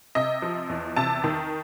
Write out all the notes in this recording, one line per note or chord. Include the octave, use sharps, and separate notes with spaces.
C3 D#5
F3
E2
C3 A5
D#3